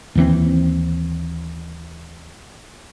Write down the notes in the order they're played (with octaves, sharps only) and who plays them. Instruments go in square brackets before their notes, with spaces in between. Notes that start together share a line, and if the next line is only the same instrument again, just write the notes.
[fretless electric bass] D#2 E3 C4